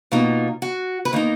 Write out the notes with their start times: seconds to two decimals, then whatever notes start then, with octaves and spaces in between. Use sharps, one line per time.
0.12 B2 A#3 D#4 F4
0.62 F#4
1.05 B4
1.13 D#3 A#3 D#4 A#4